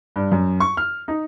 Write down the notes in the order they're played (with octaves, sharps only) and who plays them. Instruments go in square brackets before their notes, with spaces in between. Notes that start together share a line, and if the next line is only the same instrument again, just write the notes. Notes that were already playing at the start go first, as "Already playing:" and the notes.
[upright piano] G2
F#2
C#6
F6
D#4